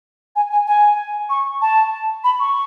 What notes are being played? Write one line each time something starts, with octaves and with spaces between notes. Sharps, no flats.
G#5
G#5
G#5
C#6
A5
B5
C#6